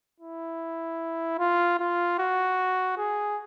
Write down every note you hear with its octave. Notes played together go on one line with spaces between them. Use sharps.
E4
F4
F4
F#4
G#4